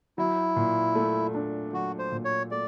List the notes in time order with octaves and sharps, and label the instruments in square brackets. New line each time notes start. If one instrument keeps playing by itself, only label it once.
[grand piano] F#3 [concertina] E4
[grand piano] A#2
A3
D4
[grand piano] F#3 [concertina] F#4
[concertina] C5
[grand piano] A#2
[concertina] C#5
[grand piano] A3 [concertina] D5